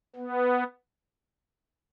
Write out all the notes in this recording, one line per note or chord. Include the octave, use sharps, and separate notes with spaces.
B3